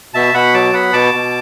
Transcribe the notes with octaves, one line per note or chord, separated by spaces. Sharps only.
B2 E5 A5
B2 F#5 B5
F#3 A5 D6
B3 F#5 B5
B2 A5 D6
B2